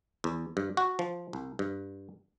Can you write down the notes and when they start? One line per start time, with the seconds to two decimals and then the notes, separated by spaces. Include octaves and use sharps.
0.24 E2
0.57 G2
0.77 F#4
0.99 F3
1.33 C2
1.59 G2